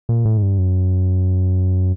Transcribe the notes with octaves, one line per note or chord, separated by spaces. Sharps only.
A#2
A2
G#2
G2
F#2